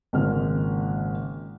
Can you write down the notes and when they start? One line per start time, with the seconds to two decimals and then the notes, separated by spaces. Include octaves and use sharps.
0.13 G#1 A#2 C#3 G#3 F6